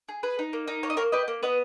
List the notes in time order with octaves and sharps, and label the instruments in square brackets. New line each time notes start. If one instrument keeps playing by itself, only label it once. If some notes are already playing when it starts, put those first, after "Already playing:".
[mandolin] G#4
G#4 B4
D#4
A#3
D#4
A#3 C#5
D#5
A#3 A#4 C#5
G4 B4 D#5
A#3
B3 B4 D#5